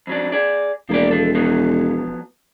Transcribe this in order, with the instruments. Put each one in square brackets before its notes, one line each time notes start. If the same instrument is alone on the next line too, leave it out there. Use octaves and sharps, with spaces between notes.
[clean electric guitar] F2 F#3 D4
G#4 D5
[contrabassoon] E1 [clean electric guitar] F3 A#3 D5
[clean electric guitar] F3 A4
F3 F#3 B3